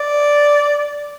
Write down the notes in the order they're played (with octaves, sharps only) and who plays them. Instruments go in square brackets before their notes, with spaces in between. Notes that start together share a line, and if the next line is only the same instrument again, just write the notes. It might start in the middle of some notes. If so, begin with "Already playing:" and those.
Already playing: [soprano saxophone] D5